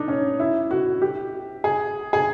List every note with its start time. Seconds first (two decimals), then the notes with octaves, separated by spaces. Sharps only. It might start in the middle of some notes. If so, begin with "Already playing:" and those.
Already playing: D4 D#4
0.08 C#4
0.40 E4
0.71 F#4
1.02 G4
1.64 G#4
2.13 G#4